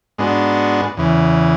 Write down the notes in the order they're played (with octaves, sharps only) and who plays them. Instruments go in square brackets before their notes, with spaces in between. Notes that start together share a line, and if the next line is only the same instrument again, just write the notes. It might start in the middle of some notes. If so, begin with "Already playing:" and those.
[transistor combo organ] G#2 G#3 B3 D4 F#4
E2 C#3 E3